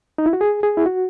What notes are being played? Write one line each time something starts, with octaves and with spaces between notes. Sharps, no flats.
D#4
E4
F#4
G#4
G#4
E4
F#4